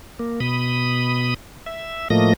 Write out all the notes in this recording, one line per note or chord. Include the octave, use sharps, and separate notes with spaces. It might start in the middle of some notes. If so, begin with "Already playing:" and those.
A#3
B2 B5 D#6
E5
A2 F3 A3 A#3 D#5 A#6